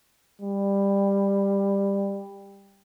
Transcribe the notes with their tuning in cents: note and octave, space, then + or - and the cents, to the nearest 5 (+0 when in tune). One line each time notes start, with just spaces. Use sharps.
G3 +15